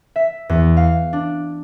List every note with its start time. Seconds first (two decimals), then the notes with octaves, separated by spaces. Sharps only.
0.16 E5
0.49 E2
0.77 F5
1.13 D4